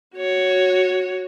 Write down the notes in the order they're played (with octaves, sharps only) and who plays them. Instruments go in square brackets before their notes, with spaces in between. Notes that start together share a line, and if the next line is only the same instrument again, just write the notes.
[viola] F#4 C#5